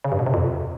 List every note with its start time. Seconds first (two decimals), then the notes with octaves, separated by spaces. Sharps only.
0.04 C#3
0.12 G2
0.19 B2
0.26 C3
0.34 F2